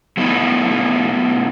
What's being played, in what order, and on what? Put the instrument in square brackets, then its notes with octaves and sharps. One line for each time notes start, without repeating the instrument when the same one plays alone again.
[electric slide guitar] F#3 A3 B3 D#4 E4